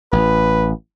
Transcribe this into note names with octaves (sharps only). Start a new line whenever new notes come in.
A1 B4